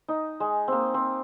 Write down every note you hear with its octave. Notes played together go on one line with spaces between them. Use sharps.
D#4
G#3
A#3 C4
C4